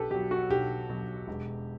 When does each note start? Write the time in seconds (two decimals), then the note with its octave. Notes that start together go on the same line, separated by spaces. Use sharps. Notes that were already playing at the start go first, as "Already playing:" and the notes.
Already playing: B1 G4 A4 B4
0.10 B2 F#3 G4
0.31 F#4
0.50 B1 G4
0.89 B2 F#3
1.28 E1